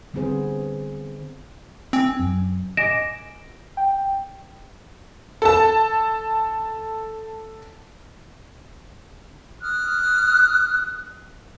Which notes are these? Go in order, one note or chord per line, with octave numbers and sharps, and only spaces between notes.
D3 G3 B3 C4 G#4 C5
C4 G#5
F#2
D#5 G#5 D6 A#6 D7 E7
G5
A4 A5
D#6 F6 F#6